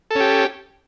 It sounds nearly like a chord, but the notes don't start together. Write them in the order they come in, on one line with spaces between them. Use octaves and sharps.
A4 C#4 G4